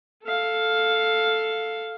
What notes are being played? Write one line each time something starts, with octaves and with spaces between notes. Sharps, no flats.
A4 F5